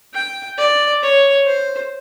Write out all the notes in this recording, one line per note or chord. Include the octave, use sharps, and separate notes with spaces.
G5
D5
C#5
C5